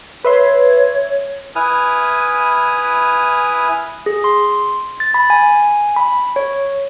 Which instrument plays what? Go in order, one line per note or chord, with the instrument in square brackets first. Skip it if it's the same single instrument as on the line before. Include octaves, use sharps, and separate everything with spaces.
[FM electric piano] B4 E5 C6 [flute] C#5
[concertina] E4 B4 G#5 D#6 F6
[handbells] G#4
C6
A6
B5
G#5
B5
C#5